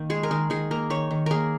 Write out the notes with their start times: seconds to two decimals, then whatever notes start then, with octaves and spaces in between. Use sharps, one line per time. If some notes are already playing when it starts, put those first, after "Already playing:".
Already playing: D#3 A#3
0.10 G#3 G#4
0.23 A#4
0.31 D#3 G#4
0.50 D#3 G#4
0.71 A#3 A#4
0.90 D#3 C#5
1.11 D#3
1.26 A#3 G#4 A#4